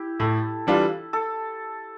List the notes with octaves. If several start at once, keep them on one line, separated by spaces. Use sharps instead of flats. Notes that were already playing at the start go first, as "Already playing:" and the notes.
Already playing: E4 G4
A2 A4
E3 G3 D4 F4
A4